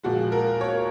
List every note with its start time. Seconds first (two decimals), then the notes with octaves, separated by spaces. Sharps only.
0.03 A#2 F3 G#3 F#4
0.32 A#4
0.61 C#5